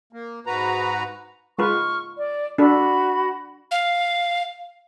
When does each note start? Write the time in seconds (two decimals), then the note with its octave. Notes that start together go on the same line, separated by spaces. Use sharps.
0.13 A#3
0.47 G#2 F#4 B4 A#5
1.59 G#3 F4 B4 C#6 F6
2.18 D5
2.58 D4 F#4 A4 B5
3.71 F5